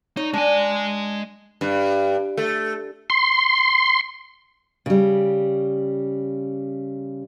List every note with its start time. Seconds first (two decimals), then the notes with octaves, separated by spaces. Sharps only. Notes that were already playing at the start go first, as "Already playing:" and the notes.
0.17 D#4 C#5
0.33 G#3 D4 G#5
1.61 G2
2.37 A3
3.10 C6
4.86 C#3 G3